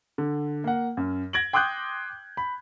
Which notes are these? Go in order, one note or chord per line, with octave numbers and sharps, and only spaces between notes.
D3
A#3 F#5
F#2
G#6 A#6 D7 F#7
G5 C6 D6 D#6 F#6 G6
B5